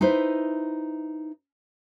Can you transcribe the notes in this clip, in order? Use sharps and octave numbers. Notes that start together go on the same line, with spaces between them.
D#4 E4 B4 C5